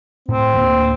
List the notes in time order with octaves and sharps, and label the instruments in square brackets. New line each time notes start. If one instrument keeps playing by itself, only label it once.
[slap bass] A2 [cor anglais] C4
[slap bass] D2 A3 A#3